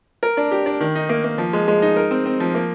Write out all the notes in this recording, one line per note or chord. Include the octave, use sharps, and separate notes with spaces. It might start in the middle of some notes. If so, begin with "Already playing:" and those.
A#4
D4
G4
D4
D#3
D#4
A#3
A#3
F3
G#3
G#3
D#4
A#4
C4
C4
F3
A#3